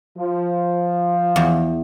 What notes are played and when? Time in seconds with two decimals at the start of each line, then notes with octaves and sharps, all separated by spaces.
0.17 F3
1.36 E2